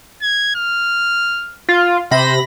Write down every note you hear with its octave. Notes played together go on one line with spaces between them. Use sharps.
G#6
F6
F4
C3 C5 B5 A#6